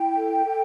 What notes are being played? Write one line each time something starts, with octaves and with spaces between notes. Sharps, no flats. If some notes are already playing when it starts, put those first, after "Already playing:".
Already playing: E4 G5
A4
A4